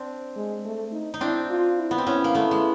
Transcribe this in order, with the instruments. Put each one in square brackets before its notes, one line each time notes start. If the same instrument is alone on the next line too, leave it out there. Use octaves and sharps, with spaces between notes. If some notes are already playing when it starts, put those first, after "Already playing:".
Already playing: [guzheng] C4 D4
[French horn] G#3
A3
D#4
[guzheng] D#4
[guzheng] C4 D4 [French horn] E4
[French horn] F4
E4
[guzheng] B3
C4
[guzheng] B3 C#4 [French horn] E4
[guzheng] A#3
A3 B3
G#3